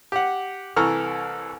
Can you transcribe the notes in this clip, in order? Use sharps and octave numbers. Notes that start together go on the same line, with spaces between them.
G4 F#5
C2 E3 A4 A#5 C#6 F6